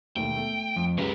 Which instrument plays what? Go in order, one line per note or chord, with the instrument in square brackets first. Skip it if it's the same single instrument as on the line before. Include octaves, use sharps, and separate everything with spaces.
[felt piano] E1 D#2 A3 [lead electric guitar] G5
[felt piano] A3 A4
[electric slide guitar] F2
[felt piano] C#2 F#2 [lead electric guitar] F#3 G4 [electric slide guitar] B4